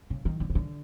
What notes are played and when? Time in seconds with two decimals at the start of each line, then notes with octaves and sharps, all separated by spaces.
0.10 C#3
0.25 D#3
0.40 D3
0.50 C#3
0.55 D3